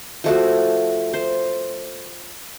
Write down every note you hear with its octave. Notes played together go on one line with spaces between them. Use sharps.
F3 A3 F#4
C5